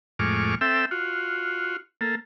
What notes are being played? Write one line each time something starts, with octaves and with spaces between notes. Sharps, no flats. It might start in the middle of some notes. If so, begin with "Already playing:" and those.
F2 A2 G#3 C#6 D6 F6
C4 A4 E5 G5 E6
F4 F#4
A#3 A4